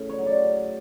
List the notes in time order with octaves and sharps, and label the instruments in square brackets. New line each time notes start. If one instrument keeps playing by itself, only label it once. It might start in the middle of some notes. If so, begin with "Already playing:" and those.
Already playing: [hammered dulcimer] A2 C#3
C#5
F#3
D5
C#3